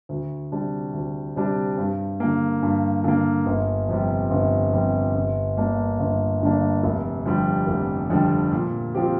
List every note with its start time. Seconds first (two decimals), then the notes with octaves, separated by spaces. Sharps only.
0.09 D2
0.52 C3 G3 D4 G4
0.94 D2
1.36 C3 G3 D4 G4
1.78 G2
2.20 D3 A#3
2.63 G2
3.04 D3 A#3
3.46 G1
3.89 F2 C3 G3
4.31 G1
4.73 F2 C3 G3
5.15 G1
5.57 G2 D3 A#3 D4
6.00 G1
6.41 G2 D3 A#3 D4
6.83 F1
7.26 F2 D3 G3
7.67 F1
8.10 F2 D3 G3
8.52 A#2
8.95 F3 C4 G4